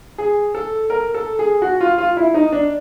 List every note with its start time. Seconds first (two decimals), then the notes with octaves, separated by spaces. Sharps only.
0.18 G#4
0.55 A4
0.90 A#4
1.14 A4
1.39 G#4
1.62 F#4
1.81 F4
1.98 F4
2.17 E4
2.34 D#4
2.52 D4